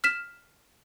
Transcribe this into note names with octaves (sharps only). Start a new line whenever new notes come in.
F6 B6 E7